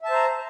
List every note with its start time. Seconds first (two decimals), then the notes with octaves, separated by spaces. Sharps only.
0.01 E5
0.05 A5
0.10 C5
0.14 A#5